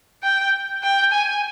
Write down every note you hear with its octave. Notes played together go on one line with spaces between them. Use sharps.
G5
G5
G#5